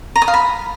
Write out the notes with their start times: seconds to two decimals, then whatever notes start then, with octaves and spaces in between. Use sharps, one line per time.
0.16 A#5
0.22 D#6
0.28 F5
0.34 B5